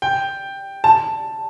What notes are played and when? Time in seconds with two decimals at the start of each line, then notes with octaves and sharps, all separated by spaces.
0.02 G5
0.84 A5